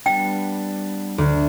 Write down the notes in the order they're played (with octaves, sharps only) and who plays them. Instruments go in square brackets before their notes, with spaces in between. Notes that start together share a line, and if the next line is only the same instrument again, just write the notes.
[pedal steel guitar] G3 B3 D4 [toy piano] G5
[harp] D2